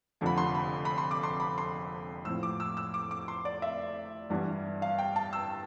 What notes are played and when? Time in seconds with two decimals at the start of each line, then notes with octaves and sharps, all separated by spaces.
0.21 F1 F2 D3 F3 B5
0.38 C6
0.55 B5
0.85 B5
0.98 C6
1.11 D6
1.23 C6
1.40 B5
1.58 C6
2.25 A2 F3 C4 E4 E6
2.43 D6
2.60 E6
2.77 E6
2.94 D6
3.11 D6
3.28 C6
3.45 D5
3.62 E5
4.30 G2 E3 G3 B3
4.82 F5
4.98 G5
5.16 A5
5.33 E6